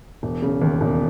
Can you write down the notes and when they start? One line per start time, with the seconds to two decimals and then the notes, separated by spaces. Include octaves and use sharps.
0.23 E1
0.42 C#3
0.62 D#2
0.81 E1